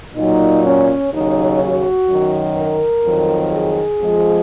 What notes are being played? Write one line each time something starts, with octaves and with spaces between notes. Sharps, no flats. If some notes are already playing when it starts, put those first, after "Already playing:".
A#2 F#3 D#4
C#4
D#2 C#3 F#3 D#4
F#4
F#2 D#3 F#3
A#4
F2 D#3 F#3
G#4
F2 F3 G#3